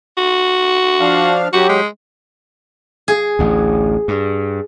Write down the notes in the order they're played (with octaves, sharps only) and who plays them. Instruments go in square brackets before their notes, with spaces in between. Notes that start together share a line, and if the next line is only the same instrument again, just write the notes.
[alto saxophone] F#4
[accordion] F3 D4 F5
[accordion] F#3 G4 [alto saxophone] F#4
[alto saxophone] G#3
[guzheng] G#4
[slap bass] A1 D2
G2